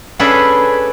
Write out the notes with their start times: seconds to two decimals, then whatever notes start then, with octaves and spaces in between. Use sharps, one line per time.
0.19 C#4 D4 G#4 A4 B4